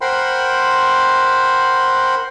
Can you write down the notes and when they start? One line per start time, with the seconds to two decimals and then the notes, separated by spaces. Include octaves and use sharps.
0.01 A#4 C5 F#5 G5 B5 C6